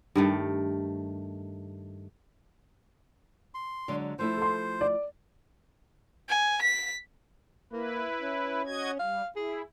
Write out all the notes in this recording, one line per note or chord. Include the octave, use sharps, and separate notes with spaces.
G2 D#3 A3
C6
D3 F#3 G#3
F3 A3 E4 C5
A4 C6
D5
G#5
B6
A#3 E4 B4
C#4
F#4 D#5 G#6
G3 F5
E4 G#4